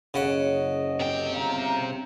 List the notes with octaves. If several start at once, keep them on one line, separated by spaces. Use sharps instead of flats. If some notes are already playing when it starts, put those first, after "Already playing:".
F#1 C#3 D#5 F#5
C3 G5
G1 F5 A#5